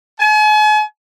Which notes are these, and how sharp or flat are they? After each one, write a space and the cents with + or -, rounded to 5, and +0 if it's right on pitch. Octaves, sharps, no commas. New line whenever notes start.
G#5 +40